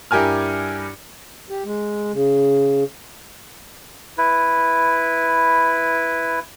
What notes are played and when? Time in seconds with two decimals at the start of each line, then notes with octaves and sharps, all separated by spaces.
0.11 G2 E4 G4 A#4 G#5 F6
1.50 G4
1.64 G#3
2.13 C#3
4.18 E4 B4